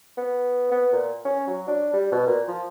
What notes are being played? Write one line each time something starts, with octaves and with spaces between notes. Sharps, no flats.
B3
B3
A#2
C#4
F#3
D4
G3
B2
A#2
F3